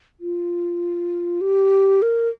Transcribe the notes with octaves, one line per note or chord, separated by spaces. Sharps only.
F4
G4
A#4